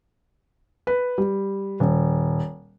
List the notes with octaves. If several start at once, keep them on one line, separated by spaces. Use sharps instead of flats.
B4
G3
D#1